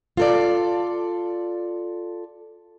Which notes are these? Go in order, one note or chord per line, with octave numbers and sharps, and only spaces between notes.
F4 A4 D5